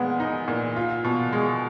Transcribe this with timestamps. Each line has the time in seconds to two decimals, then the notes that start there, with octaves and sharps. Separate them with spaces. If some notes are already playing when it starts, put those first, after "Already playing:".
Already playing: A#2 G#3 B3
0.20 D#4
0.48 A#2
0.76 F4
1.04 B2
1.33 G#3